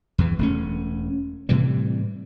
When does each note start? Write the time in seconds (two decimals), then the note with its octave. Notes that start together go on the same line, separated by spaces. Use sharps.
0.18 E2 E3
0.39 E1 A3 C#4
1.49 A2 C3 E3 G3